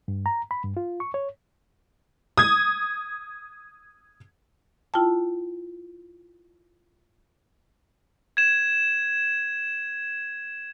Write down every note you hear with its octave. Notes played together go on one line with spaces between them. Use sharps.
G2
A#5
B5
G2
F4
C#6
C#5
D#6 G#6
E4 F4 G5 A5
G#6 E7